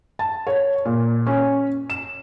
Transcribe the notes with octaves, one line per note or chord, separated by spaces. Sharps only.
A5
C#5
A#2
C#4
E7